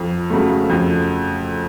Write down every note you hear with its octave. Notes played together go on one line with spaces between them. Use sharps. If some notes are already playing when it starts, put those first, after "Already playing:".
Already playing: F2
C#3 F#3 A3
F2